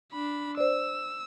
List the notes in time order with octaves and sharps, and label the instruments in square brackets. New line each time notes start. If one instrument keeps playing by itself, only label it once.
[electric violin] D4 B5
[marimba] C5 D5 [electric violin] E6